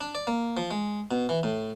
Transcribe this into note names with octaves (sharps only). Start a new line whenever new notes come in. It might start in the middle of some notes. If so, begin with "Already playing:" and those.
D4
D5
A#3
F3
G#3
B2
E3
A2